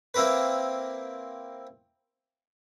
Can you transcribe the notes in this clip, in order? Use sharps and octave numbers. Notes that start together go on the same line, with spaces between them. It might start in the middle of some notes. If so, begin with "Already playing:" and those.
A#3 C4 E4 A#4 B4